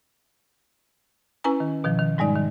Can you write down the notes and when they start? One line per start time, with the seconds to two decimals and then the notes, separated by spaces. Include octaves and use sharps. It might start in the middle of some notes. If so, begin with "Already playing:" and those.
1.44 C#4 E4 B4 G#5 A#5
1.60 D#3
1.84 B2 D#3 F3
1.99 D#3
2.18 G#2 G3 G#3 D#4 D5
2.35 D#3